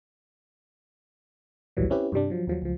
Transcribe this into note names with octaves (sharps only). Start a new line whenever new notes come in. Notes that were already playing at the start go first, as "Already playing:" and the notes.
A#1 D#2 A2 E3 F#3 G3
C4 C#4 E4 G4 B4
G2 C3 G3 D4
F3 F#3
D#2 F3 F#3
C#2 F3